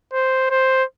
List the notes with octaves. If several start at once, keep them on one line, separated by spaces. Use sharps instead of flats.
C5
C5